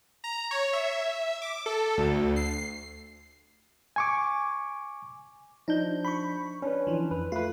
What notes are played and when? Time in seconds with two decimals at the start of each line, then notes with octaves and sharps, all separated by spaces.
0.24 A#5
0.51 C#5
0.73 E5
1.42 D6
1.66 A4
1.98 D2
2.36 C7
3.96 G#5 C#6 D6
5.68 F3 D4 D#4 G6
6.05 B5 C#6
6.62 C#4 D4 B4
6.87 E3 F3
7.11 F2 B4
7.32 A3 F4 B4